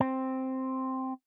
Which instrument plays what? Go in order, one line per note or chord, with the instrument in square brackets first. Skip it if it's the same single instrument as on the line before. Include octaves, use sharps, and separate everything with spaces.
[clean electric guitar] C4